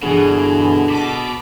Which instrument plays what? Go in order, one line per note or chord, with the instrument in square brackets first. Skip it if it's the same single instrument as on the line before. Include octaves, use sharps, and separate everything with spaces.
[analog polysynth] G2 E3 G#4 [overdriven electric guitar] B2 [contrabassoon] D3
[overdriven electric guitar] B2 [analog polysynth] A5 D6 B6